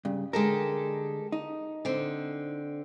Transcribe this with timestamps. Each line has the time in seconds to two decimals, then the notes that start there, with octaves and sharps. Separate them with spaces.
0.05 G2 C#3
0.33 D3 G#3 G4 A4 A#4
1.32 D#4
1.85 D3 C4